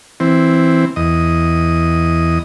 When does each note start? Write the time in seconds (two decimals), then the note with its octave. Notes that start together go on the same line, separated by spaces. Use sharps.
0.20 E3 C4
0.96 E2 D#5